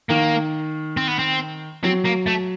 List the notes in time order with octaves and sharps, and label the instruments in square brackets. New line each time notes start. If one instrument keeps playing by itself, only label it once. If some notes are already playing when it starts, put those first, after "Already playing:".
[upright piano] D#3 [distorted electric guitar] A#3
[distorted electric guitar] C4
B3
C4
[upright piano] F#3 [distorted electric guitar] C4
[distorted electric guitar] A#3
A3